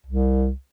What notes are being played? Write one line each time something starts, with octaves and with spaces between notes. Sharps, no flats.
C2